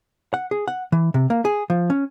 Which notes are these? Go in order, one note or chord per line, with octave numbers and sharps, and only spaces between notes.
F#5
G#4
F#5
E3
C3
A#3
G#4
F3
C#4